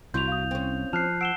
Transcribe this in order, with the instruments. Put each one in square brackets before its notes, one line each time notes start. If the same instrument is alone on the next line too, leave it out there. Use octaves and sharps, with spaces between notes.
[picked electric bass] C2 [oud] F#3 E4 [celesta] C6 [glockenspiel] G6 F7
[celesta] F5 D#6
[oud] C4 C#4
[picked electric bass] F3 [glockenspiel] A5 F#6 C7 [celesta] F6 F7
[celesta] F#5 E6 D7 [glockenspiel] C7 E7 G7